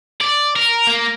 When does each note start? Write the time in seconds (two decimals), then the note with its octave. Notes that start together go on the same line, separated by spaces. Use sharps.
0.21 D5
0.56 A#4
0.87 A#3